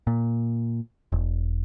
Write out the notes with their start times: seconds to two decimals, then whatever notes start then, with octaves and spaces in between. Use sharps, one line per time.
0.07 A#2
1.12 E1